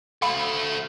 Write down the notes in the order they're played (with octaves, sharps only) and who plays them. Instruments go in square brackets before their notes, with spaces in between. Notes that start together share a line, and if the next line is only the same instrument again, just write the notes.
[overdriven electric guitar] A3 F#4 [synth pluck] F5 B5